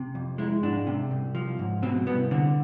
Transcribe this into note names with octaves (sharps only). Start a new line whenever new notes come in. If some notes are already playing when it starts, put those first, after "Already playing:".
Already playing: C3
F2
G#3 E4
G#2 D4
C3
C2
F3
G#2
B2 C4
C2 B3
D3 C4